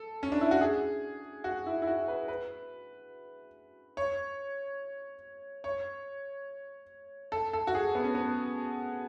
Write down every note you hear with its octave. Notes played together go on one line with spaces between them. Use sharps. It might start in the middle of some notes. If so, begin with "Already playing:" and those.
Already playing: A4
C#4
D4
E4
F#4
G#4
F#4
E4
E4
F#4
B4
B4
C#5
C#5
A4
A4
F#4
G#4
B3
C#4
B3